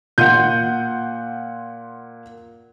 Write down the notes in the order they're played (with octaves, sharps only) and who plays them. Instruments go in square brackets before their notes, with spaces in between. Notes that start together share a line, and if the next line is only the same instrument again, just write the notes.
[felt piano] A#2 C6 D#7 [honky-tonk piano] F#5 G6